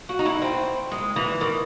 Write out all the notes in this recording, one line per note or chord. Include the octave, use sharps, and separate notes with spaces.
F#4
D#4
E4
C4
G#3
E3
D#3